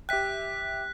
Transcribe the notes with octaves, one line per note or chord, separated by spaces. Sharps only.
G4 E5 G5 F#6 B6